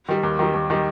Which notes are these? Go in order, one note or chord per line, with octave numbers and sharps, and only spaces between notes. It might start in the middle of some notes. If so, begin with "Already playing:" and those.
D#3 G3
D#2
D#3 G3
D#2
D#3 G3